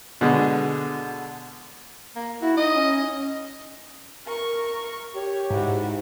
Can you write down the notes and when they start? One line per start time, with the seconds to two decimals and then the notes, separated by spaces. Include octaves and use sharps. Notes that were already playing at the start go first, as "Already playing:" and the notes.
0.21 B2 D3 G#3
2.16 A#3
2.42 E4 F#4
2.57 D#4 D#5
2.75 C#4
2.93 D#5
4.27 A#4 C#6
5.15 G4 C#5
5.50 G#2 E4 F#4